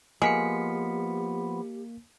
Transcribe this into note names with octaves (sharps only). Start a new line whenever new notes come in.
F3 G#3 A#3 B3 G4 B6 C#7